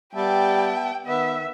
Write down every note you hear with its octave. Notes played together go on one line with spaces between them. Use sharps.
G3 B3 E5 G5 A5
D#3 B3 E5